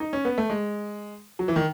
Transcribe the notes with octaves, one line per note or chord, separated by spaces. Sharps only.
D#4
C#4
B3
A3
G#3
F#3
E3
D#3